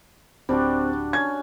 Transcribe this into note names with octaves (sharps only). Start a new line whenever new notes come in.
D1 G3 C4 D4 F#4
C#4 G#6